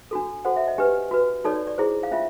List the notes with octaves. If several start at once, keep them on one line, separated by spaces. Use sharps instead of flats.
D4 F#4 A4
F#4 A4 C5 F#5
E5
D#5
D4 G4 B4
F#4 B4
D#4 F#4 A4 C#5 D5
D5
D5
E4 G#4 C5
F5
C#4 F4 E5